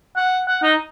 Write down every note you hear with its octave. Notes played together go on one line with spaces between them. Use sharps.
F#5
F#5
D#4